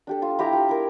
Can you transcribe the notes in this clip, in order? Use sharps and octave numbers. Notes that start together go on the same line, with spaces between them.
D4 G4 A4
F4 A5
E4 G4 G5 A#5
F4
E4 A#4